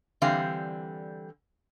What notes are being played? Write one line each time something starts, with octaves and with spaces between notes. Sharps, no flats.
D3 E3 G3 C4 F5